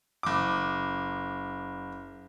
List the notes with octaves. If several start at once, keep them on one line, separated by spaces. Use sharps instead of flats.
F#1 D6